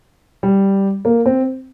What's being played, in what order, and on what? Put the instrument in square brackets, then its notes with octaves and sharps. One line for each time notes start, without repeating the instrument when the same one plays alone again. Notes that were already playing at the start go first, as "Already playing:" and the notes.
[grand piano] G3
A#3
C4